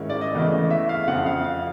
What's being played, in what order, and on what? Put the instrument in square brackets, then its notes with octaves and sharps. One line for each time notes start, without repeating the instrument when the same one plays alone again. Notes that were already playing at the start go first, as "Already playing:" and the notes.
Already playing: [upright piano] G#2 D#3 G#3 C#4 E4
D5
D#5
E2 C#3 E3 A3
E5
F5
F2 C#3 F3 F#5
F5
F5